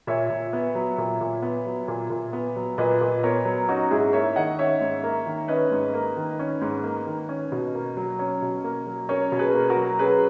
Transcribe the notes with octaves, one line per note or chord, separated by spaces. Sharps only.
A#2 C#5 E5
A#2
B3
F#3
A#2
A#2
B3
F#3
A#2
A#2
B3
F#3
A#2 B4 D#5
A#2
B3 A#4 C#5
F#3
C#4 D#4 F#4
G#2 E4 G#4
A#3 C#5 E5
D#3 D#5 F#5
C#4 C#5 E5
G#2
A#3
D#3
C#4 B4 D#5
G#2
A#3
D#3
C#4
G#2
A#3
D#3
C#4
B2
A#3
F#3
C#4
B2
A#3
F#3
C#4 A#4 C#5
B2
G#4 B4
A#3
F#4 A#4
F#3
C#4 G#4 B4